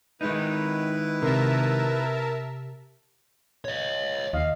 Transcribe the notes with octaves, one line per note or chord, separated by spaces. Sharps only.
D#3 G#3 D#4 E4 B4
C3 A#4 E5 A5
C#5 D#5
D#2 D#5 F5